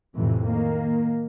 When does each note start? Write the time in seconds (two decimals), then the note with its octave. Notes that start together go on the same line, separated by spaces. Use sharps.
0.14 F2 A2 C3 E3
0.47 D#3 A#3